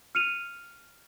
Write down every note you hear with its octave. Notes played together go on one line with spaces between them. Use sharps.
F6 C#7 D#7 F7